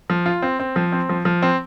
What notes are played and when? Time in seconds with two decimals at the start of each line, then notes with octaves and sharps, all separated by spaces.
0.10 F3
0.26 F4
0.42 C4
0.60 C4
0.76 F3
0.92 C4
1.09 F3
1.25 F3
1.42 C4